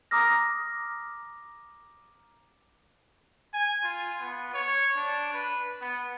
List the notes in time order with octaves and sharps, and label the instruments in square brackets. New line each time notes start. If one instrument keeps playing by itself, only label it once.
[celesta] A#5 D6 D#6 F6 A#6
[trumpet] G#5
F4
B3
C#5
D4
B4
B3